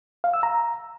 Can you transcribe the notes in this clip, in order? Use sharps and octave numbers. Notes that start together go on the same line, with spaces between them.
F5
E6
A#5